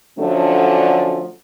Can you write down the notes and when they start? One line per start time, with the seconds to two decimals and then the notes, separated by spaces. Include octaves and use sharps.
0.19 D3 F3 F#3 A3 C#4 D4